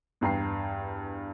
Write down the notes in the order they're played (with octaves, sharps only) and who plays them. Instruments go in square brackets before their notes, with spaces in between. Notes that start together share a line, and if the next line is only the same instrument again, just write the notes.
[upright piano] E2 G2 G5 A#5 C7